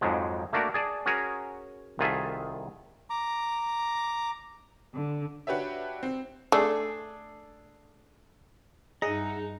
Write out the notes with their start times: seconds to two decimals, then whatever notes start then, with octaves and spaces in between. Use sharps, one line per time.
0.01 F2 G#2 F3 F#3 G#3
0.53 A3 A#3 D4 F#4 A#4
0.74 G#4 D5 A5
1.06 C#4 F#4 G#4 A#4 C#5
1.99 C2 D#3 F4 G#4 A4 E5
3.10 A#5 D6
4.95 D3
5.47 D4 F#4 G4 B4 C#5 E5
6.03 C4
6.52 A3 D4 G#4 A4
9.02 G2 D#4 G#4 D#5 E5 F#5 A#5